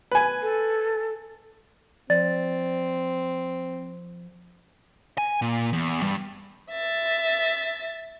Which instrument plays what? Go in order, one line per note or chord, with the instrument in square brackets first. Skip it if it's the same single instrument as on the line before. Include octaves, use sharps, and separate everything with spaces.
[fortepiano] B4 G#5
[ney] A4
[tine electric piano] F3 [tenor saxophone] C4 [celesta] D5 A6
[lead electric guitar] G#5
A#2
E2
G2
[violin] E5 A6